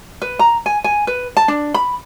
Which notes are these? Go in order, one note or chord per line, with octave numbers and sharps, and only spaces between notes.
B4
A#5
G#5
G#5
B4
A5
D4
B5